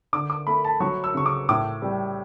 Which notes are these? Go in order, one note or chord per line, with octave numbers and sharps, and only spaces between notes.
D3 D6
D6
A3 B5
A5
F#3 C#6
E6
C#3 C#6
D6
A2 D6
G3